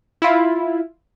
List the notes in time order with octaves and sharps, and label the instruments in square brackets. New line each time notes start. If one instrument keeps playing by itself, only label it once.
[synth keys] E4 F4